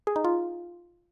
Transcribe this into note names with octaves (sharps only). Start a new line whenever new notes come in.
G#4
D#4
F4